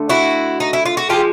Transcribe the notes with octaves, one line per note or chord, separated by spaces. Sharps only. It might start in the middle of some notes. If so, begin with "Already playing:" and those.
Already playing: D3 A3
E4 F#4
D#4
E4
F4
F#4
D3 F3 G#3 F4 G4